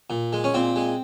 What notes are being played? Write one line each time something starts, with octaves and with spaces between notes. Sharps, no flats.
A#2
G#3
C#4
A#2 C4
G#3